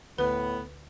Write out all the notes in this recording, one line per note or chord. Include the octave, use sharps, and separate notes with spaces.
D2 A2 B3 B4